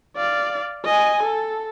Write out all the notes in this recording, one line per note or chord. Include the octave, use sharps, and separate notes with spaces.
D5 F5
D#5 G#5
A4